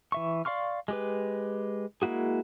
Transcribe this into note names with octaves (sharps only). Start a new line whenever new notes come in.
E3 E5 C#6
D5 F5 C6 C#6 F6
G#3 G4 B4
G#3 A#3 E4 F#4 G#4